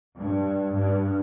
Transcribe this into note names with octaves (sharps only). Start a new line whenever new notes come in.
G2
G2